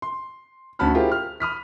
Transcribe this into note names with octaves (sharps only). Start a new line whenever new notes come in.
C6
D2 C#4 F#4 A5 B5 F6
E4 F4 G4 G#4 A#4 C5
F6
B5 D#6 F6 B6